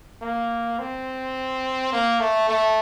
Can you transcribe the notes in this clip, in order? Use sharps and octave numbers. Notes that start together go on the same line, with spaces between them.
A#3
C4
A#3
A3
A3